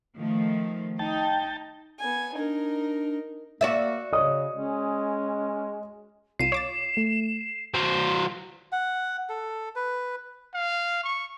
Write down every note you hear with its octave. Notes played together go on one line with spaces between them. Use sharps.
D#3 F3 A3
D#4 G5 A5
B3 G#5
D4 D#4 A#4
A#3 F#4 D5 E5
C#3 C#5 D#5 D#6
G#3 C#4
C2 F4 C7 D#7 E7
C#5 D6 A6
A3
F#3 C5
F#5
A4
B4
F5
C#6